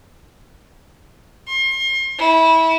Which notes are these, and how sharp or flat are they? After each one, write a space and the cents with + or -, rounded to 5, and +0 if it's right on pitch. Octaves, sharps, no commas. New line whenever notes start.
C6 +35
E4 -20